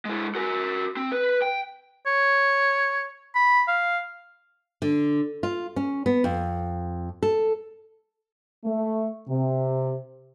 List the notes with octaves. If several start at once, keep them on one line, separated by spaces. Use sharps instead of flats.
G#3 E4
F#4 A#4
C4
B4
G5
C#5
B5
F5
D3
F4
C#4
B3
F2
A4
A3
C3